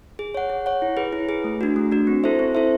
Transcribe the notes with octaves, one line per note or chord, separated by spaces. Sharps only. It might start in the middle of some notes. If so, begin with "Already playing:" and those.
G#4
C#5 F#5
G#4
C#5 F#5
E4
G#4 B4
E4
G#4 B4
A3
D4 F#4
A3
D4 F#4
C4
E4 A4 C5 E5
C4
E4 A4 C5 E5